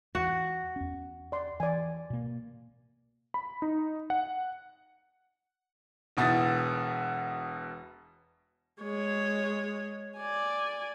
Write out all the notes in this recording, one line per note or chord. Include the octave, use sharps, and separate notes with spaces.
E2 F#4
E2 C#4
D5 C6
E3 D5 G#5
B2 A#3
B5
D#4
F#5
E1 B2 B3 E4 D#6 A6
G#3 C#5
D5 G#5